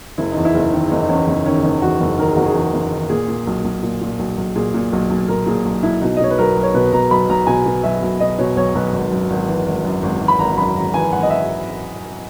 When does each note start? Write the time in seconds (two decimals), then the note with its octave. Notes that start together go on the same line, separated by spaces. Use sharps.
0.18 F#1 E4
0.32 E2 D#4
0.45 E4
0.54 F#1
0.73 D#3
0.90 F#1 D#4
1.02 D#4
1.09 E2 C#4
1.27 F#1 D#4
1.46 D#3 C#4
1.63 F#1 D#4
1.82 E2 F#4
2.01 F#1
2.18 D#3 A#4
2.28 G#4
2.37 F#1 F#4
2.46 G#4
2.55 E2
2.73 F#1
2.92 D#3
3.09 A#2 G#4
3.28 A#2
3.47 B1
3.64 B1
3.83 A#2
4.01 A#2
4.19 B1
4.37 B1
4.56 A#2 G#4
4.74 A#2
4.92 B1
5.10 B1
5.28 A#2 A#4
5.46 A#2 G#4
5.65 B1
5.83 B1 E4
6.01 B2 D#4
6.16 D#5
6.20 B2 C#5
6.31 B4
6.38 B1 A#4
6.56 B1
6.63 C#5
6.74 B2 B4
6.92 B2 A#5
7.11 B1 B5
7.29 B1 A#5
7.47 B2 G#5
7.66 B2
7.83 B1 E5
8.02 B1
8.20 B2 D#5
8.39 B2 C#5
8.56 B1 C#5
8.75 B1 B4
8.93 G#1
9.11 F#2
9.30 G#1
9.48 E3
9.66 G#1
9.84 F#2
10.03 G#1
10.21 E3
10.28 B5
10.39 G#1 A#5
10.57 F#2 B5
10.75 G#1 A#5
10.94 E3 G#5
11.12 G#1 F#5
11.23 D#5
11.30 E5